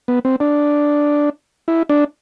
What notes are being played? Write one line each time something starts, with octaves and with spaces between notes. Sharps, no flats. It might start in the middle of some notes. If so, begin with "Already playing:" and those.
B3
C4
D4
E4
D4